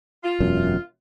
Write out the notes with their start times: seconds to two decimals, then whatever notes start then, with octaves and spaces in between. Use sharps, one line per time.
0.24 F4
0.40 E1 F#2